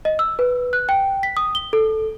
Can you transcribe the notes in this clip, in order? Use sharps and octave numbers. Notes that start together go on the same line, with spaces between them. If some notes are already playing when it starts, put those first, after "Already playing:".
D#5
E6
B4
F#6
G5
B6
D#6
G7
A4